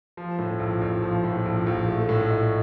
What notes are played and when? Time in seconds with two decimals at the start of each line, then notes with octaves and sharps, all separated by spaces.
0.17 F3
0.39 A2
0.59 A#1
0.81 A#1
1.02 F3
1.24 A2
1.46 A#1
1.67 A#1
1.88 A3
2.09 A2
2.30 D#4